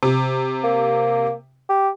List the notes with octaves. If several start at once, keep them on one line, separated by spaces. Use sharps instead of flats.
C3
A#3
G4